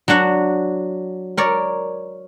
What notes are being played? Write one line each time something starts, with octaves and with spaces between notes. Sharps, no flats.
F#3 D4 F#4 F#5
A#4 C#5 D5